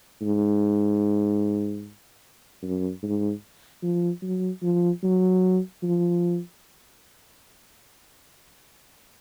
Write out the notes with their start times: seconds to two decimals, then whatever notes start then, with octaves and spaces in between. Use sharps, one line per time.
0.22 G#2
2.63 F#2
3.03 G#2
3.82 F3
4.22 F#3
4.63 F3
5.03 F#3
5.83 F3